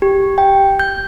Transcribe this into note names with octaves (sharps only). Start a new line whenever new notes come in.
G4
G5
G6